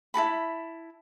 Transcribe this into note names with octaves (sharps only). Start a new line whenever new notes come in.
E4 F#4 A5 B5